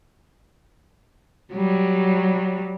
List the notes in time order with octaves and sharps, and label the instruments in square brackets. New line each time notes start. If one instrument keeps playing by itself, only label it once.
[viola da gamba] F#3 G3